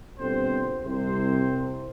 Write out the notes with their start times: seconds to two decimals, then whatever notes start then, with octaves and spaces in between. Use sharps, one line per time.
0.19 G1 B2 D3 C4 C5
0.85 C2 C3 C5